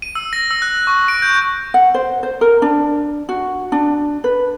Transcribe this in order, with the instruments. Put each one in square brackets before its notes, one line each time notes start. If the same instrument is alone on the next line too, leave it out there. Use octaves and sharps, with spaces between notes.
[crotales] D#7
E6
A#6
E6
F#6
C#6
D7
G6
[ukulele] F#5
C5
C5
A#4
D4
F#4
D4
B4